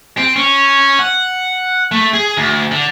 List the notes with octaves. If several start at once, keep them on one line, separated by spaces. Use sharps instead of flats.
C4
C#4
F#5
A3
G#4
D2
D3